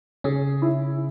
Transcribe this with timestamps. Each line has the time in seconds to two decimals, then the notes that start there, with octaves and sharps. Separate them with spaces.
0.24 C#3 C#4 G#4
0.62 E4